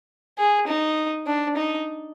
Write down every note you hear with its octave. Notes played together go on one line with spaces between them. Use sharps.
G#4
D#4
D4
D#4